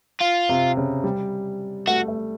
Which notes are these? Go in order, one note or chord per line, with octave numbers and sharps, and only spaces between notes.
F4
C3
C#3
G3
A3 F#4
A3